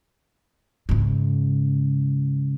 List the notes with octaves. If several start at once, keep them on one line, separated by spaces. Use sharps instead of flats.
G#2 C#3